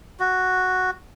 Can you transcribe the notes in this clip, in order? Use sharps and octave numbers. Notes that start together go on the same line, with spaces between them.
F#4